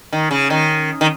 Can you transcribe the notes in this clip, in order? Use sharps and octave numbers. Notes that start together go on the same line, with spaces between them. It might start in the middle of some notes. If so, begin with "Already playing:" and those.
D#3
C#3
D#3
D#3